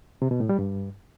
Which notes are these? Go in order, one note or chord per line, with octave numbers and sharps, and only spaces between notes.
C3
B2
A2
G3
G2